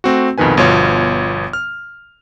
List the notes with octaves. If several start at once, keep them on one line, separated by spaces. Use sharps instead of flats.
A3 C4 F#4
C2 F2 B2 D#3 B4 G#5
G1 B2 F3 F4 C#5
F6